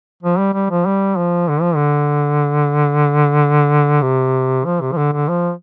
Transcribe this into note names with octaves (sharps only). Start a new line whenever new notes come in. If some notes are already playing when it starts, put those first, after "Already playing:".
F3
G3
G3
F3
G3
F3
D3
F3
D3
C3
F3
C3
F3
D3
D3
F3